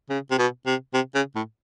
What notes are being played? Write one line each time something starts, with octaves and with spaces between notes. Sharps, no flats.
C#3
C3
B2
C3
C3
C#3
A2